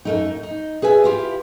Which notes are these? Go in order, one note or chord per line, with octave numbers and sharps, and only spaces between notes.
F#2 A3 D#4
D#4
G#4 B4 E5 G#5
E4 F4 G4